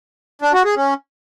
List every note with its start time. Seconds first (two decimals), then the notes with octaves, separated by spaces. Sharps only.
0.42 D4
0.53 F#4
0.65 G#4
0.76 C#4